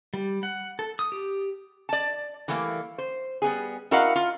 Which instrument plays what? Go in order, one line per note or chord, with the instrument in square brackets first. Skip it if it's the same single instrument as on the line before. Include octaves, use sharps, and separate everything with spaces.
[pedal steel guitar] G3
F#5
A4
D#6
G4
[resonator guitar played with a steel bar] D5 A5
E3 G3 A3 A#3
C5
G3 B3 G#4
E4 F#4 A#4 D#5 F5 F#5
F4